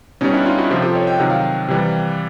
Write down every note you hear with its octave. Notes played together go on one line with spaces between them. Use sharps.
B2 G3 C#4 D#4
D4 E4
D#4 F4
E4 F#4
C3 F3 F4 G4
G4 A4
C#5 D#5
G5
C3 D#3 F#3 F#5
F5 G5
C3 E3 G3